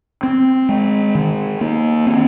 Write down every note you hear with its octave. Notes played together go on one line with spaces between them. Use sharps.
C4
G#3
D#3
A#3
C4